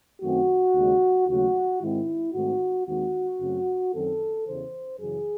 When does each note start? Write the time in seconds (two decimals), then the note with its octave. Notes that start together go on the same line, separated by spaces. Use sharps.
0.21 F#2 D#3 A3 C4 F#4
0.75 D#2 C#3 G#3
1.27 D#2 C#3 F#3 A3 F#4
1.81 G#2 D#3 G#3 C4 E4
2.33 G#2 D#3 A3 C4 F#4
2.86 D#2 D#3 G#3 C4 F#4
3.40 F#2 C#3 F#3 A3 C4
3.92 F#2 D#3 F#3 C4 A4
4.45 E2 C#3 E3 C5
4.99 F#2 C#3 E3 G#4